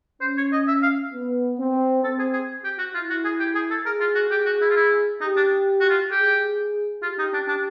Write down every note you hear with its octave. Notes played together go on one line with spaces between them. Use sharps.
C#4 C5
C#5
D#5
E5
F5
B3
C4
C4 A4
G#4
G#4
G4
F#4
E4 F4
F#4
G#4
G4
G#4
A4
G#4 A#4
F4
F#4
G4 G#4
F#4
E4
F4
E4
D#4 G4
D4
F#4
F4
G4 G#4
F4 G4
D#4
D4
D4